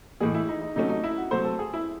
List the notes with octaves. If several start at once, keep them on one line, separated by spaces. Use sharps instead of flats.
A2 E3 G#3 G#4
E4
D#4
D#4
C3 F#3 A3 C#4 D#4
D#4
E4
F#4
C3 F#3 A3 C5
A4
G#4
E4